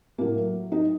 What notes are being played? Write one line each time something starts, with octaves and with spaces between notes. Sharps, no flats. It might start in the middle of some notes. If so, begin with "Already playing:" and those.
A2 F#3 A#3
D#4